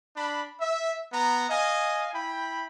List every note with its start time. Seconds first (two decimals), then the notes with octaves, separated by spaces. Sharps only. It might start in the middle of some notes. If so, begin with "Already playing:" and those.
0.15 D4 B5
0.59 E5
1.12 B3 A#5
1.48 D#5 F5 G#5
2.13 E4 G5 B5